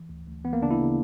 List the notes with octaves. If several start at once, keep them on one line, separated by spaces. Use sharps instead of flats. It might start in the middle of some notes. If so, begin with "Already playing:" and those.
Already playing: E3
D2
D2
E3 B3
A#3
C#3 D4
E4
C#3